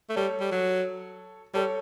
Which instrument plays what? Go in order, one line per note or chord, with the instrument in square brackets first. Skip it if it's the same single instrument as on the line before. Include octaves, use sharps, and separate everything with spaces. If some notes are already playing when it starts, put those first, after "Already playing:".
[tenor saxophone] A3
[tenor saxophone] G3 [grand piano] A4 C#5
[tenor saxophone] G3
F#3
[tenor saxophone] G3 [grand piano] A4 C#5